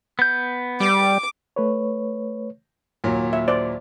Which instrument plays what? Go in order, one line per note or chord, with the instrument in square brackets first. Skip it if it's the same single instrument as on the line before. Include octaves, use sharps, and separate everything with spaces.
[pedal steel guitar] B3 G6
[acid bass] G3 [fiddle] D6
[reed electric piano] A3 B4 C#5
[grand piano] D#2 A#2 F#3
[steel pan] E5
C5 D5